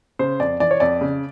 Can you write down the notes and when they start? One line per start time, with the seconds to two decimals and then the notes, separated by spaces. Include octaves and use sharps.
0.19 C#3 C5
0.40 F2 D5
0.60 E3 D5
0.71 C#5
0.80 F2 D5
1.01 C#3